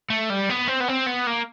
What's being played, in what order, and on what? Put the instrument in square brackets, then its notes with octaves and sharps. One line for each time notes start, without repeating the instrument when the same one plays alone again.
[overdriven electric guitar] A3
G3
B3
C4
B3
C4
B3
A#3